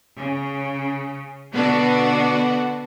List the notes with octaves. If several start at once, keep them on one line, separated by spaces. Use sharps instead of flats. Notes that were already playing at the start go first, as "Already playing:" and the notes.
C#3
B2 D3 B3 D4 F#4